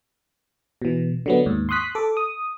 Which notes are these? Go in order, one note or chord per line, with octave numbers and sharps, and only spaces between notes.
B2 E3
D3 F#3 B3
D#2 G#2
C6 C#6 D#6 F#6 B6
A4 D6
D#6